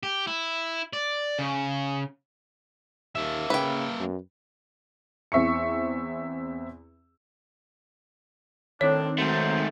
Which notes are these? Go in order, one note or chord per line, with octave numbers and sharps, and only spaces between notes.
G4
E4
D5
C#3
D#2 A#3 E5
C#3 B4 G5
F#2
E2 C4 E5 C#6 C#7
A2 D#3 C4 D4 C#5
G#2 F#3 A3 C5